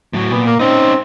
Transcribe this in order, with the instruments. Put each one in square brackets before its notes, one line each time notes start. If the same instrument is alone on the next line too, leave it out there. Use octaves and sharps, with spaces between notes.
[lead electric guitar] A2 F#3
[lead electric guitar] A#2 [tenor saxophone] B3
[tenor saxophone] A#3
[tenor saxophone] C4 [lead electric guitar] C#4 D#4